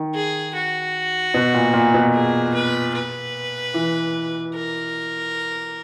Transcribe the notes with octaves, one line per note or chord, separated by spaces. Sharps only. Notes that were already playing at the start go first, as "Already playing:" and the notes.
Already playing: D#3
G#4
F#4
B2
A#2
A#2
B2
G#4
B4
B4
E3
A#4